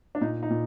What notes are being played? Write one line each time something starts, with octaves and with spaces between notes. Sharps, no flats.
D4
A#2 D#4
D#4
A#2